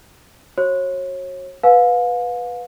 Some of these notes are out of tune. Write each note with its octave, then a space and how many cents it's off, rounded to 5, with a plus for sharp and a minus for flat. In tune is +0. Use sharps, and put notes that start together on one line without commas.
F#4 +0 C#5 -35
B4 +0 F5 +35 G#5 +35